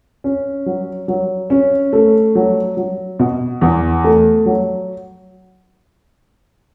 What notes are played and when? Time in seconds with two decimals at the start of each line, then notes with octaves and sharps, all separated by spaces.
0.24 C#4
0.66 F#3
1.08 F#3
1.50 C#4
1.93 A3
2.35 F#3
2.77 F#3
3.19 B2
3.61 E2
4.04 A3
4.46 F#3